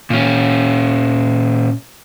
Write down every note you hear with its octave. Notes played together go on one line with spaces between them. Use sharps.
A#2 C#4